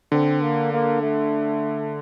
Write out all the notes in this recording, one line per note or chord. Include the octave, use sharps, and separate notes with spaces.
D3 C4
A#3
A#3
A3